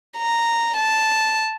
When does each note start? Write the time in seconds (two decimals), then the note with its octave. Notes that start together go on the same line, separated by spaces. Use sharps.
0.17 A#5
0.77 A5